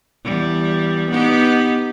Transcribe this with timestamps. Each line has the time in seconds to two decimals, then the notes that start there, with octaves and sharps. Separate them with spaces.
0.24 E2 G3
1.11 B3 D#4 G4